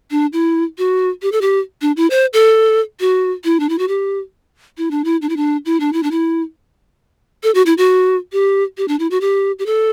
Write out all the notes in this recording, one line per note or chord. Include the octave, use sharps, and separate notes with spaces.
D4
E4
F#4
G4
A4
G4
D4
E4
C5
A4
F#4
E4
D4
E4
F#4
G4
E4
D4
E4
D4
E4
D4
E4
D4
E4
D4
E4
A4
F#4
E4
F#4
G4
G4
D4
E4
F#4
G4
G4
A4